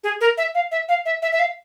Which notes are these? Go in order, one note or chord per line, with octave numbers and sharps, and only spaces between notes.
G#4
A#4
E5
F5
E5
F5
E5
E5
E5
F5